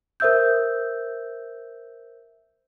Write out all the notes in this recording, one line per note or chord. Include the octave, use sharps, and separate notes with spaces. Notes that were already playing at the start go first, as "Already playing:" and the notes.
A#4 C5 E5 E6 G6